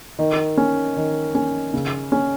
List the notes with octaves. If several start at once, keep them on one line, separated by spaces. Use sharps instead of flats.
D#3
C#4
D#3
C#4
C#3
C#4